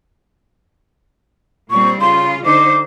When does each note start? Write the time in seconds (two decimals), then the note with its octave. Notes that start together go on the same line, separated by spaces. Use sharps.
1.71 A#2 G3 C4 C#6
2.01 C#3 F4 C6
2.45 D3 D#4 C5 D6